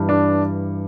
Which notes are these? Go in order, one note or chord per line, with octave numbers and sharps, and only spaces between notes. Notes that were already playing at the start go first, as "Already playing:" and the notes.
Already playing: G2 E3
D4